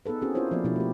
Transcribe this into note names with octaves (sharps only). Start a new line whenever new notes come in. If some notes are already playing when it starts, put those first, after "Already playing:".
B3 D#4 G#4 A4 B4
C4 C#4 D#4 F#4 G#4
C#4 E4 F4 A#4 C5 C#5
F3 A#3 B3 F#4 D5
B2 F3 D4 E4 G4
A3 G4